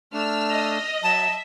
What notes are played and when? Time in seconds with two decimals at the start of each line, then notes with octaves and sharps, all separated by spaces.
0.13 A3 D4 E6 F6
0.50 D#5
1.03 F#3 E5 A5